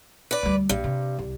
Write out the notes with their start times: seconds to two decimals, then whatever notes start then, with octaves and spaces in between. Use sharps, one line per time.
0.31 B4 D5
0.43 D2 G3
0.69 A#1 G2
0.84 C3
1.19 C2